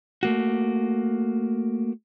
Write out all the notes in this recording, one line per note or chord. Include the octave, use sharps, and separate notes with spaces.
A3 A#3 F#4